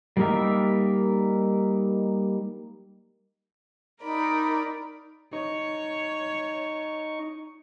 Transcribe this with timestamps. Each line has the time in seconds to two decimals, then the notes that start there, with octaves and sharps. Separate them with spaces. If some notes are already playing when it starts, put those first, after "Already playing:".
0.17 G3 A#3 D#4 A#4 E5
4.02 D#4 A#4 D5 B5
5.33 D#4 C#5 C#6